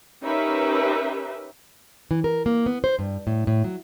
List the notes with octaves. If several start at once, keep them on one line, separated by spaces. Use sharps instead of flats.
C#4 D#4 G4 A#4 B4 E5
E3
A#4
A#3
B3
C5
G2
A2
A2
F#3